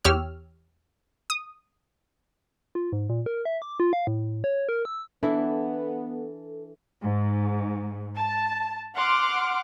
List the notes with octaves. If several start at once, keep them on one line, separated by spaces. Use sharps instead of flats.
E2 G4 C#5 E6 F6
D#6
F4
G#2
A#2
A#4
E5
D6
F4
F5
A2
C#5
A#4
E6
E3 B3 D4 E4 A4 E5
G#2
A5
F#5 C6 D6 F6